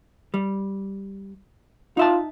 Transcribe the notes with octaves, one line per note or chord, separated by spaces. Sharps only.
G3
D#4 F4 E5 A5